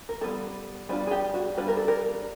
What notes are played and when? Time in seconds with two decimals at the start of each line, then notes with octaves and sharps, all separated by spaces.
0.09 A#4
0.21 G3 B3 D4 F4 A4
0.89 G3 B3 D4 F4 G#4
1.07 G#4
1.11 G4
1.34 F#4
1.57 G3 B3 D4 F4 B4
1.68 A#4
1.77 A4
1.88 A#4